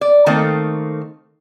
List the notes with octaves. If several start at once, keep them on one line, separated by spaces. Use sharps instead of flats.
D5
D#3 A3 A#3 C4 D#4 A4